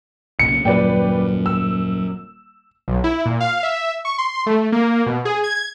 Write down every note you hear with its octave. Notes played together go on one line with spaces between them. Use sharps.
B1 A#2 C#3 C#7
D#1 F#2 B4 D5 G5
E6
B1
E4
A#2
F5
E5
C#6
C6
A3
A#3
B2
G#4
G#6